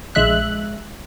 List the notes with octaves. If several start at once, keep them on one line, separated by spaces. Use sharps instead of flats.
A#1 G#3 E5 F#6